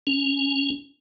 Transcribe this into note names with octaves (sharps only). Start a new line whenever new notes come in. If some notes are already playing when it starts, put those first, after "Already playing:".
C#4